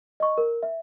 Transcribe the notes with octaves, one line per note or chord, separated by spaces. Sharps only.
D#5 C#6
A#4
E5